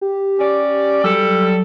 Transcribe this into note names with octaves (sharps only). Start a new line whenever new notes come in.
G4
C#4 D5
F#3 G3 A4